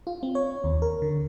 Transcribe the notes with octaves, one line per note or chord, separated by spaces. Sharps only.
F4
C4
C#5
D#2
A#4
D3